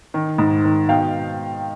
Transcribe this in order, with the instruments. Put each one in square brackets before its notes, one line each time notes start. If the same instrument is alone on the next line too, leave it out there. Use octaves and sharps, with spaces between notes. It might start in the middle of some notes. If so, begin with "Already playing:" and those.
[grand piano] D#3
G#2
D#3
B2 F5 G5